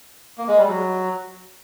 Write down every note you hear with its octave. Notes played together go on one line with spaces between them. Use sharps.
A#3
G#3
G3
F#3